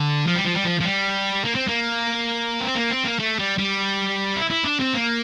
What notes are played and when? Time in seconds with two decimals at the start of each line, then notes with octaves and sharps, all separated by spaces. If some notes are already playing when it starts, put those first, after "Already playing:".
Already playing: D3
0.27 F3
0.36 G3
0.45 F3
0.55 G3
0.65 F3
0.80 F3
0.85 G3
1.44 A#3
1.55 C4
1.67 A#3
2.61 C4
2.76 A#3
2.90 C4
3.05 A#3
3.19 A3
3.39 G3
3.58 G3
4.36 E4
4.50 E4
4.64 D4
4.80 C4
4.94 A#3